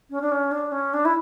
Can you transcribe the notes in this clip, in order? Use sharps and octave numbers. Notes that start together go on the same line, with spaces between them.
C#4
D4
C#4
D4
C#4
D4
E4